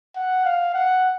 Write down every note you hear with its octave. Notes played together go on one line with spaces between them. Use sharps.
F#5
F5
F#5